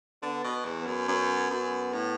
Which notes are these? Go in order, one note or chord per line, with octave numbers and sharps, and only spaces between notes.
D3 B3
B2
E2
B3
F#2
F#2 B3
F#2
A2